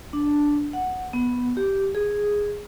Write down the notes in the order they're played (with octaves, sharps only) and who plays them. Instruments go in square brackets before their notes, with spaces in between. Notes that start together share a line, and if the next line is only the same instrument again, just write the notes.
[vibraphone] D4
F#5
B3
G4
G#4